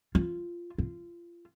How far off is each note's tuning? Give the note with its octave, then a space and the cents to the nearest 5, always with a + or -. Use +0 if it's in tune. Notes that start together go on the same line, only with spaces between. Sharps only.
F4 -10
F4 -25